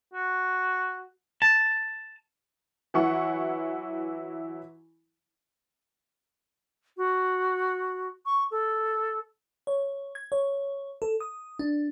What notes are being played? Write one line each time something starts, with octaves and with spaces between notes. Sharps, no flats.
F#4
A5
E3 F#3 E4 F#5 C#6
F#4
C#6
A4
C#5
G#6
C#5
A4
D#6
D4